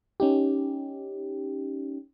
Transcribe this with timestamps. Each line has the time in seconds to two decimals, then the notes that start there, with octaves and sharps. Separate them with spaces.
0.20 C#4 D#4 G4